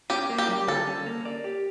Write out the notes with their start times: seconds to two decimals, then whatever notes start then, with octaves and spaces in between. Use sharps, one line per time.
0.10 C#4 G4
0.30 A#3
0.38 G4
0.48 G3
0.67 D3 A4
0.87 C#4
1.06 A#3
1.25 D5
1.44 G4